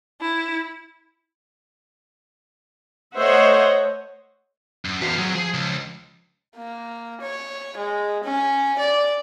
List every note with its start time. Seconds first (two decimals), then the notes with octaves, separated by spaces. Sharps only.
0.21 E4
3.16 A3 C5 C#5 D#5 E5 F#5
4.85 F#2
5.01 E2 F#4 B4 F5
5.18 F#3 C4 G#4
5.35 F3 G#4
5.54 C#2
6.56 A#3
7.21 C#5
7.77 G#3
8.24 C#4
8.79 D5